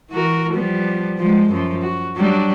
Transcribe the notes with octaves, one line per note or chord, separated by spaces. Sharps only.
E3 F#4 A#4
F3 G3 B3
F3 G#3
F#2 F3
F#4
F#3 G3 D4